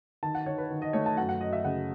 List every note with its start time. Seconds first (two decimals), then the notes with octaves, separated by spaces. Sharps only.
0.23 D#3 A5
0.35 F#5
0.46 D#3 C#5
0.58 B4
0.70 D#3
0.82 D#5
0.93 A3 C#5
1.06 A5
1.17 F#2 F#5
1.29 F#5
1.40 F#2 D#5
1.53 E5
1.64 C#3 F#5